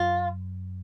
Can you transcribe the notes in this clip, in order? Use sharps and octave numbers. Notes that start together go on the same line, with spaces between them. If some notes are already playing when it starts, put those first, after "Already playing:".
Already playing: F#2 F4